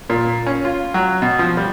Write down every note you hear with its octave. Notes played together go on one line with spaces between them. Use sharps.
A#2
C#4
F4
F#3
B2
F3
G3